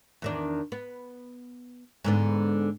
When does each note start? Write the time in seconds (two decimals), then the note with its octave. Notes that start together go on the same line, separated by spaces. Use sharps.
0.22 E2 D#3 D4
0.72 B3
2.04 G#2 D3 B3